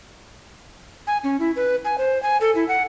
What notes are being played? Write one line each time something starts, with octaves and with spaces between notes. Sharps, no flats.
G#5
C#4
E4
B4
G#5
C5
G#5
A4
E4
F#5